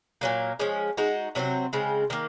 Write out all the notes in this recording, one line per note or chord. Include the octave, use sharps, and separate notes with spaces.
A#2 F#3 A#3
F3 G#3 C#4
G#3 D#4 F#4
C3 F#3 C4 F#4
C#3 G#3 C4
D#3 A#3